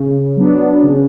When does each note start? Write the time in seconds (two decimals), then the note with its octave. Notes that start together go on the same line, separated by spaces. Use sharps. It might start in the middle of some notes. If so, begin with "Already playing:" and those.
Already playing: C#3
0.37 F#3 B3 D4
0.83 C#3